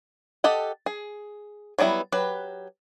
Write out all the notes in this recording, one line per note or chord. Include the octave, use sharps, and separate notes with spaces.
G4 A4 D#5 F#5
G#4
F#3 G3 B3 D#4 E4
F#3 G4 B4